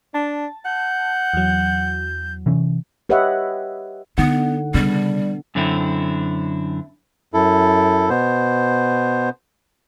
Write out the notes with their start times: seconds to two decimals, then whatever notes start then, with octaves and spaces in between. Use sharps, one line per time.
0.14 D4 A5
0.65 F#5 G6
1.34 E2 F#3
2.46 C3 E3 C#4
3.09 G4 B4 C#5 D#5 E5 F#5
4.18 D3 B3 D#4 F#5
4.74 C#3 G3 B3 D4
5.55 F#2 D3 C4 E4
7.34 F#2 E4 A4
8.09 B2 B3 C5